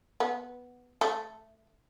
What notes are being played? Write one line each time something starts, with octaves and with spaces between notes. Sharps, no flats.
B3
A3